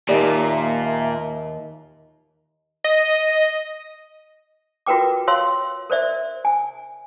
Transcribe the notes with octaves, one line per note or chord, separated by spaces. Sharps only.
D#2 A#2 G4 D5 E5
D#5
F4 F#4 A#4 B4 G5 D6
C#5 F5 C6 E6
A#4 C5 D5 E5
G#5